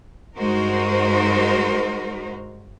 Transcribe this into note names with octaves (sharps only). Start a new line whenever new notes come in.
G2 G#3 D#4 F#4 A#4 C5